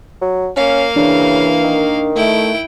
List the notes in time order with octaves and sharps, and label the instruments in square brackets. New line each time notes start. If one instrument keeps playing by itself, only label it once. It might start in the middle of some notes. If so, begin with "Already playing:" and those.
[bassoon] F#3
[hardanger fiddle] A#3 F5 [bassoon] C#4
[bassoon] C#3 [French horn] E3 [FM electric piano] D4
[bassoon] D#3
[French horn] A3 [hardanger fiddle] E4 G5